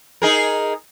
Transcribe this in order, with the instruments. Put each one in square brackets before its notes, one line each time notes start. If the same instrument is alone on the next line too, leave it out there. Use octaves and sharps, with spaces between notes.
[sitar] D#4 G#4 A#4